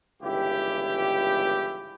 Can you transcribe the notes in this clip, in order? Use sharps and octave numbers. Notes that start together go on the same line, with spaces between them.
G1 C#2 E3 E4 G4